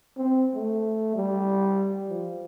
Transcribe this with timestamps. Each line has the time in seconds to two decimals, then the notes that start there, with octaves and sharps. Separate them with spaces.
0.17 C4
0.55 A3
1.15 G3
2.10 F3